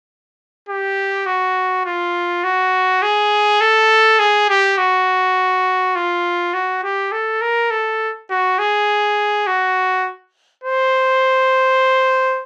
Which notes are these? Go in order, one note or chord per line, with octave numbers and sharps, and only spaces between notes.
G4
F#4
F4
F#4
G#4
A4
G#4
G4
F#4
F4
F#4
G4
A4
A#4
A4
F#4
G#4
F#4
C5